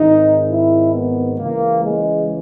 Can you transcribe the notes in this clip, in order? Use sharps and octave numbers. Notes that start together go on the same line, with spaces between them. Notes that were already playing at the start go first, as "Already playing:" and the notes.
Already playing: G#1 G#2 D#3 G#3 D#4
E4
B3
C#2 C#3 E3 G#3 A#3
G#3